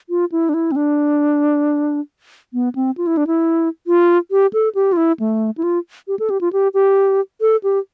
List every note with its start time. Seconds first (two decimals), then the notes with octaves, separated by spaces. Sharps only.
0.10 F4
0.32 E4
0.49 D4
0.54 E4
0.72 C4
0.76 D4
2.54 B3
2.75 C4
2.98 F4
3.07 E4
3.17 D4
3.27 E4
3.87 F4
4.31 G4
4.53 A4
4.75 G4
4.93 F4
4.97 E4
5.20 A3
5.58 E4
5.63 F4
6.08 G4
6.19 A4
6.30 G4
6.41 F4
6.53 G4
6.74 G4
7.41 A4
7.63 G4